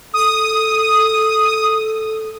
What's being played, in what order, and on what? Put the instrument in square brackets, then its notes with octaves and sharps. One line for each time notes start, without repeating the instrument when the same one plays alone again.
[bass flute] A4 [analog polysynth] D#6